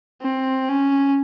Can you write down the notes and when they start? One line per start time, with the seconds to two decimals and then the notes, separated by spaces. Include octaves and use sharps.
0.22 C4
0.69 C#4